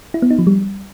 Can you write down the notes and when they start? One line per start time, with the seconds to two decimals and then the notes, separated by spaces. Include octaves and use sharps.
0.14 E4
0.22 B3
0.30 D#4
0.39 F3
0.47 G3